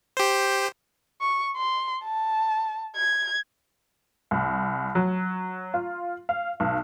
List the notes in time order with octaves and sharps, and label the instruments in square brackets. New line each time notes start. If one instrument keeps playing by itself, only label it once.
[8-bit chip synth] G4 C5
[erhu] C#6
C6
A5
G#6
[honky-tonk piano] C2
F#3
F4
F5
B1